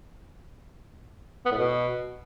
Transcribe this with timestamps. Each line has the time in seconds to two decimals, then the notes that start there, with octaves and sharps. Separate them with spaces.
1.46 B3
1.51 A2
1.57 B2